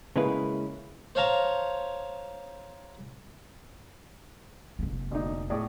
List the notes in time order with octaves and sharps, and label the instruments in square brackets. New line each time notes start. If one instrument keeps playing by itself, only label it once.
[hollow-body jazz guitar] C#3 G#3 A#3 C#4 E4 B4
[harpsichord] C5 C#5 F5 A5 A#5
[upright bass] F1 A#3
[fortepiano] D2 D#4
A2 G#4 D5